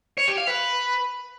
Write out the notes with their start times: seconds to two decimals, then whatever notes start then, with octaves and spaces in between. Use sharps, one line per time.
0.18 C#5
0.28 G4
0.37 F5
0.47 B4